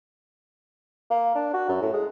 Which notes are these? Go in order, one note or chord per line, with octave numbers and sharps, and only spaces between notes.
A#3
D4
F#4
F#2
A2
G#3